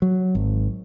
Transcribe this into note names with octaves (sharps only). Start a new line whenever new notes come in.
F#3
G#1